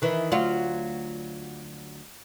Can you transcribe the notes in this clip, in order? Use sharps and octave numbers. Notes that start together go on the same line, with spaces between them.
D#3 E3
D2 F#3 F4